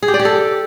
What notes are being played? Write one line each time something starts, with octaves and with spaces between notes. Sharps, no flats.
G#4
G4
D5
G4
A4